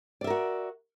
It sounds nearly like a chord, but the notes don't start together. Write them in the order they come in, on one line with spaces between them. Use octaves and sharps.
D5 E5 A#4 F#4